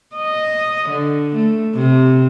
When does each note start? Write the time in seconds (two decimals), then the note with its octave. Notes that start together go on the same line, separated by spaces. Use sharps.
0.16 D#5
0.89 D3
1.34 A3
1.75 C3